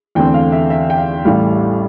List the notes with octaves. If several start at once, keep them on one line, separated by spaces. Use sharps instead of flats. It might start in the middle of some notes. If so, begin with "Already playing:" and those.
E2 D3 A3 C4 G5
F5
E5
E5
G5
F5
A1 A2 G3 F5